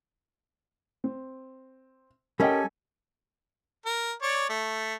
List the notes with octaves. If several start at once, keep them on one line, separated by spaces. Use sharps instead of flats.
C4
G3 C#4 A4 A#4 D#5 G5 G#5
A#4
C#5 D5
A3